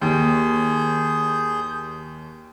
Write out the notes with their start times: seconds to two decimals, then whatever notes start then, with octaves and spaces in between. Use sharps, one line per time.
0.01 D#2 G#4 G6